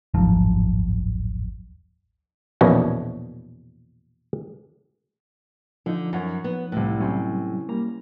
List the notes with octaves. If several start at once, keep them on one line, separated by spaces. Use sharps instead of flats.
D1 G#1 F#2 F3
A#1 E2 B2 C#4
D3 F3 D#4
F#2 C#5 F#5 A#5
B3
C2 A2 F#6
C3 F#3 G3 C4 C#4
G3 A#3 A#5